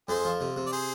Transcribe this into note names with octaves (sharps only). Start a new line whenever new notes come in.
F2 G#4 C5
F3
C3
C3
D5
G#4 C5